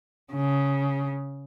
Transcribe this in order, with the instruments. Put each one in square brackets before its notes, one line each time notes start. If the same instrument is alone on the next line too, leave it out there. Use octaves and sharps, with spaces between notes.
[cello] C#3